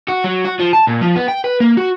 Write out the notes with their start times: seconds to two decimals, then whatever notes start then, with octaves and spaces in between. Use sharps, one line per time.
0.08 F#4
0.24 F#3
0.45 F#4
0.60 F3
0.73 A5
0.87 A#2
1.01 F3
1.15 B3
1.28 G5
1.44 B4
1.60 A#3
1.77 F#4